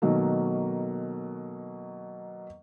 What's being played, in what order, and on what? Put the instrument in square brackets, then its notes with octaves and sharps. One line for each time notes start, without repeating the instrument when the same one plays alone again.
[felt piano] B2 D#3 F#3 A3 A#3